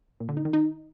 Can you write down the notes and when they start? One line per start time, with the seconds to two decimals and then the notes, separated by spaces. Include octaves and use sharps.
0.20 A#2
0.29 D3
0.37 D#4
0.45 D#3
0.53 D#4